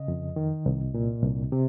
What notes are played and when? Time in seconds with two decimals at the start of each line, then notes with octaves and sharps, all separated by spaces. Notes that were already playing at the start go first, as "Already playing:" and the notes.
Already playing: C#3 D#5
0.08 F2
0.36 D#3
0.66 C2
0.94 A#2
1.22 C2
1.52 C3